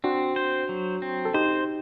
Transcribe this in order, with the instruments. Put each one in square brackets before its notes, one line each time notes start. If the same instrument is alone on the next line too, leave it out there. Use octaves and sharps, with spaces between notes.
[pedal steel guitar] C4 [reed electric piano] D4 F#4
[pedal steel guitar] C5
F#3
C4
[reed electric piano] A4
[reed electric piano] D#4 G4 [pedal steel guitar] C5